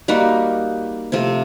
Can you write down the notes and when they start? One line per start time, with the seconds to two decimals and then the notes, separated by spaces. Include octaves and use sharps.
0.08 G3 A#3 D#4 F#4
1.12 C3 F3 A3 C4